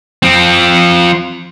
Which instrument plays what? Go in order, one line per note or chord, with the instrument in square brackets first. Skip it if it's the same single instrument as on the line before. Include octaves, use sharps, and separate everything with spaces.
[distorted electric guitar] F3 C4